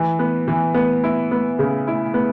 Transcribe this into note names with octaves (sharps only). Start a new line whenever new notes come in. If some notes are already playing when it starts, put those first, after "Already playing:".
Already playing: E3
B3
E3
B3
E4
B3
C#3
E4
B3